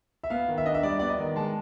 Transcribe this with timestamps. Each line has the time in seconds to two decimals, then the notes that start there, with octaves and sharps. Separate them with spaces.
0.24 E5
0.30 B3 F5
0.48 D#3
0.58 E5
0.66 D4 D#5
0.74 E5
0.83 G3 D5
0.99 B3 D5
1.09 D#5
1.19 D#3
1.36 G#3 A5